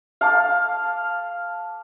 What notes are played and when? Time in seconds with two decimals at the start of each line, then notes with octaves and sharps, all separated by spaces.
0.21 F5 A5 D6